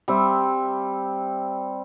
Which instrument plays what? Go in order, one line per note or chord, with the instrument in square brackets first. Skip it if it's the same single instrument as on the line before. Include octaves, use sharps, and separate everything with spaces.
[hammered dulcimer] G3 C4 E5